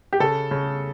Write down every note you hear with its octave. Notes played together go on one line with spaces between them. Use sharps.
G4
C#3 A4
C#3